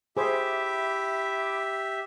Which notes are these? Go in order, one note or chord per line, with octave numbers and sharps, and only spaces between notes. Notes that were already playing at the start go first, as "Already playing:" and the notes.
E4 G4 G#4 C5 E5 D6